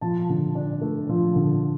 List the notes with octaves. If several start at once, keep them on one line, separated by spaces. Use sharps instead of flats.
F3 A5
D3
D4
A3
F3
D3